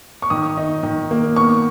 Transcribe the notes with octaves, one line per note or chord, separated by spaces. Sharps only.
C#6
D#3 D#6
D#4
D#3
A#3
B3 C#6